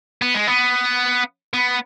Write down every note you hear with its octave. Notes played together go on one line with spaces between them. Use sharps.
B3
G#3
B3
B3